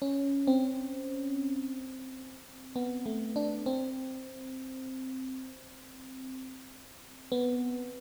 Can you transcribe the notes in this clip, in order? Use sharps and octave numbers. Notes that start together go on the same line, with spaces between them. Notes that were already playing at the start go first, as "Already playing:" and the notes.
C#4
C4
B3
A3
D4
C4
B3